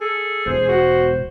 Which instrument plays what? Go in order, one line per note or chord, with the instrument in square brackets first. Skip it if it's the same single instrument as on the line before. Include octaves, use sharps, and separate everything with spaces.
[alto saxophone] G#4 [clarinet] A4
[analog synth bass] E1 [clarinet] C5
[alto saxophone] F#4